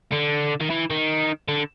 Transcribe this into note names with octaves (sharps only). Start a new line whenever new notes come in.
D3
D#3
E3
D#3
D3